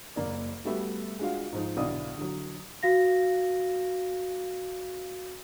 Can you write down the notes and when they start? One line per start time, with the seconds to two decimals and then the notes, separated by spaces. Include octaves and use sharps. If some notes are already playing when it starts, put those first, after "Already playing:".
0.16 F#1 A#3 D5
0.65 G3 A3 B3 F#4 E5
1.19 G#3 D4 F4 F#4 F5
1.52 G#2 F3 D#4
1.77 B1 D3 E4 D5 F5 D#6
2.17 D3 F#3
2.83 F#4 F5 A#6